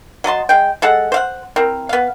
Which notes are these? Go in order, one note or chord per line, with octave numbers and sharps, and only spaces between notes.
F#3 D#5 A5 C6
G#3 G5
G#3 A4 F#5
C5 F5 F#5
C4 E4 A#4
B3 F5